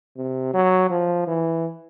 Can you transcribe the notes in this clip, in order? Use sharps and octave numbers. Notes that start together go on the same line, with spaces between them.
C3
F#3
F3
E3